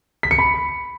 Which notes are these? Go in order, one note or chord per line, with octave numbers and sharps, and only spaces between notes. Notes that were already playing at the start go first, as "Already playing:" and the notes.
B6
C#7
B5